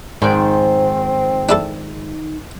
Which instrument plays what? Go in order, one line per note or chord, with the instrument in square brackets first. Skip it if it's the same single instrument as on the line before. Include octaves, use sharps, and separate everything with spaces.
[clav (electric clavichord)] G#2 [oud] D#3 F3 D5 [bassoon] C4
[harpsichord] D4 E4 A4